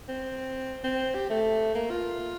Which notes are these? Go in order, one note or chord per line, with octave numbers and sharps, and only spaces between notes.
C4
C4
G4
A3
A#3
F4